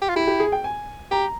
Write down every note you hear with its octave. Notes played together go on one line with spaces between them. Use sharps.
G4
F4
E4 G4
G4
G#4
G5
G#5
G4 A#5